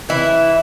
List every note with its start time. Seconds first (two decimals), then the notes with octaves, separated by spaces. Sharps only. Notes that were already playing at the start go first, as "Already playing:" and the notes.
0.09 E3 E4